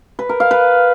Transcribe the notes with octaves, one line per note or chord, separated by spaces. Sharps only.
B4
A#4
F5
B4